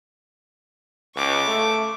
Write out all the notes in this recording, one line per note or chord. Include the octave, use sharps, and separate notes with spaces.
C#2 C#6 D6
A3